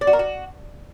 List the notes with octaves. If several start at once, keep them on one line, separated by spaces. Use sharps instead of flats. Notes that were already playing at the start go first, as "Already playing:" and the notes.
D5
F#4
A#4
F#4